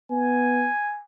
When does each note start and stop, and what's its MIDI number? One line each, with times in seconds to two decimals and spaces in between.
0.11 0.69 59
0.11 1.02 80